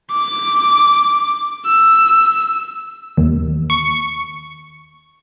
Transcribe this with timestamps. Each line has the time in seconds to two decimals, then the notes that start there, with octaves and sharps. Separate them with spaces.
0.11 D6
1.66 E6
3.17 D#2
3.70 C#6